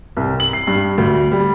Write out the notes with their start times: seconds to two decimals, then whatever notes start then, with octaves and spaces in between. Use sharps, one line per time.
0.17 C2
0.40 F#7
0.53 C7
0.67 G2
0.98 D2
1.32 G3